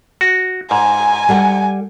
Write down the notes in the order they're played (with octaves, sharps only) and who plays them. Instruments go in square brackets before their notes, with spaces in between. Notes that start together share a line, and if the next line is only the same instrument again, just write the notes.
[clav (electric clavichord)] F#4
[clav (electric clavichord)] G#2 [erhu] G#5
[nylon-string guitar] G3 A4 F#5